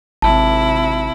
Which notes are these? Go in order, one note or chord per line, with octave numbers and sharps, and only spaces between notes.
G#1 C3 E4 A5